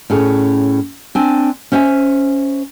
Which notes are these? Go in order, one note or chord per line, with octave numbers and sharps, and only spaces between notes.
A2 C#4 G#4
C4 D4 G#5
C#4 C5 E5 F5 G#5